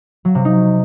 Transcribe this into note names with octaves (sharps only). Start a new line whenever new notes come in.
F#3
C3
D#4